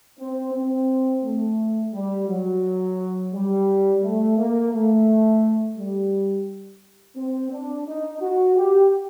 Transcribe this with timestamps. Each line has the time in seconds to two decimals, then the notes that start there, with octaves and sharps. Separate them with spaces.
0.19 C4
0.54 C4
1.23 A3
1.94 G3
2.29 F#3
3.33 G3
4.03 A3
4.38 A#3
4.73 A3
5.77 G3
7.17 C4
7.52 D4
7.87 D#4
8.21 F#4
8.56 G4